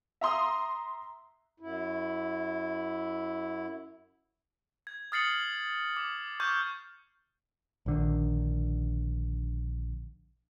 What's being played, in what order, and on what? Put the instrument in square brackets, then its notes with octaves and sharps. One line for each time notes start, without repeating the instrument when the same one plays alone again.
[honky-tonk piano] E5 A#5 C6 D#6
[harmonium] F#2 E4
[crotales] G#6
D#6 F6 A6 C7 C#7 F#7
D6
C#6 D6 F6 G6 G#6
[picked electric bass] A#1 D3 D#3